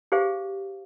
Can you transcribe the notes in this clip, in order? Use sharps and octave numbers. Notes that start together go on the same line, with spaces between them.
G4 G#4 C5 F5